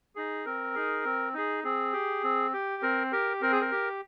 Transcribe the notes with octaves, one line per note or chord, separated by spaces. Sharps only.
D#4 G#4
C4 A#4
D#4 G#4
C4
D#4 G#4
C4 G#4
G4
C4
G4
C4 A#4
G4 A#4
C4 A#4
G#4
A#4
G4